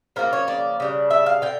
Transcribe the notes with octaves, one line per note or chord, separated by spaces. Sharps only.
C#3 F3 A#3 A#4
C#5
D5
C#3 G3 D4
E5
F5
D3 G5